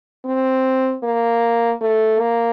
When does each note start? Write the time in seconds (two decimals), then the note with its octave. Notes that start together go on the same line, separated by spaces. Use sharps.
0.25 C4
1.03 A#3
1.81 A3
2.20 A#3